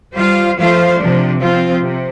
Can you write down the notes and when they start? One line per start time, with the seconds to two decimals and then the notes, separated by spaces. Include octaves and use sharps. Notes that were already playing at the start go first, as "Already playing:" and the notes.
0.16 G3 F4 C5 F5
0.57 F3 A3 F4 C5 F5
0.98 C3 F3 D4
1.40 F3 C4 F4
1.81 C3